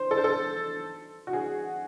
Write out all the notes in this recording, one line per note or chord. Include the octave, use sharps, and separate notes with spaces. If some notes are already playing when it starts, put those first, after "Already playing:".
Already playing: C5
A4
C5
A4
F#4
G#4